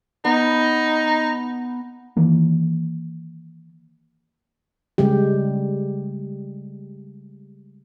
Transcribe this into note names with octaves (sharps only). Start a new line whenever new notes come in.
B3 D#4
D#3 E3 A#3
C#3 G3 G#3 G4